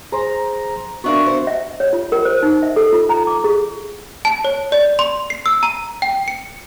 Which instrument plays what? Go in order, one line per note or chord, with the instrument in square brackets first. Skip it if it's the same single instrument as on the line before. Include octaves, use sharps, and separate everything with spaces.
[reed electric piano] G#4 C5 C6 [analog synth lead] A#5
[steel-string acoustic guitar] B3 D4 A#4 [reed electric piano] F#4 E5 F5 [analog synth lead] C#6
[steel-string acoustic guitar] C5
[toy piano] E5
C#5
F4
A#4
C5
D#4
E5
A4
F4
A#5
D6
G#4
[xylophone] A5
C#5
D5
C6
C7
E6
A#5
G5
C#7